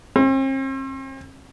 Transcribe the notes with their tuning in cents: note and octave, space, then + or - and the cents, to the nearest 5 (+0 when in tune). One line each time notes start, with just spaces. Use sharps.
C4 +45